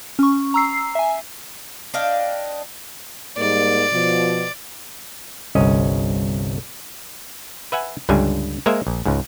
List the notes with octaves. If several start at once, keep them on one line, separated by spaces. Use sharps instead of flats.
C#4 C#6
A#5 E6 C7
E5 G#5
D4 D#5 F5 G5
G#2 G3 A#3 D5
B2 F3
G1 C2 C#4 D#5
B4 E5 F#5 G#5
C#2 G2 D3 G3 G#5
G#3 A#3 A#4 C5 E5
A#1
C#2 G#2